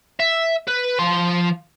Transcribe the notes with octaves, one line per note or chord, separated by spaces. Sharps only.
E5
B4
F3 C6